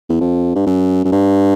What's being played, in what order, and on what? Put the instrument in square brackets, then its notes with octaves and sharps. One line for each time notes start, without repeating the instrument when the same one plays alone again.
[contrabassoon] E2
F2
G2
F#2
F#2
G2